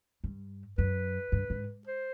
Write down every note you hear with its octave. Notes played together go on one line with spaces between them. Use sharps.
G2
F#2 B4
G2
G#2
C5